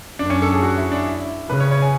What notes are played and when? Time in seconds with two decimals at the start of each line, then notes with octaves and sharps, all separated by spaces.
0.19 F#2 D4
0.30 C#4
0.42 A4
0.52 G#4
0.62 F#4
0.78 E4
0.92 D4
1.07 E4
1.49 C#3 B4
1.60 C#5
1.71 C#5
1.82 G#5